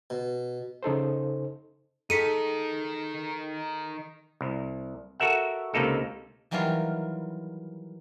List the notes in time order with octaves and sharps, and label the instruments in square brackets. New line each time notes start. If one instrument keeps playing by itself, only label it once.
[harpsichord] B2
[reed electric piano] C#3 D#4 A4 C5
[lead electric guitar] D#3 D#4 [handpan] G#4 A4 [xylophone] B6 C#7 D#7
[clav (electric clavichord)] C2
F#4 A4 A#4 E5 F#5
C#2 C3 A#3 D#4 A4
[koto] D#3 E3 F#3 G3 F4 A#4